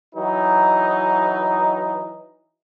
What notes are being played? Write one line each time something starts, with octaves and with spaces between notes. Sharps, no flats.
E3 F#3 D#4